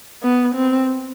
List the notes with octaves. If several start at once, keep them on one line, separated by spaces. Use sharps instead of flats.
B3
C4